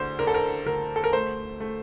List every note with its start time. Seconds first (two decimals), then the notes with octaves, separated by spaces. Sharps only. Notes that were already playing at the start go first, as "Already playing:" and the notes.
Already playing: D2 D3 C5
0.19 D3 A#4
0.27 A4
0.34 A#4
0.66 D2 A#4
0.96 A4
1.04 A#4
1.13 A3 C5
1.60 A3